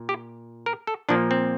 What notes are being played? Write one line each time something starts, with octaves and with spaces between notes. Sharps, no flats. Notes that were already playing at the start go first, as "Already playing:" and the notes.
Already playing: A#2
G4
A#4
A4
A#2 F3 A#3 D4
C4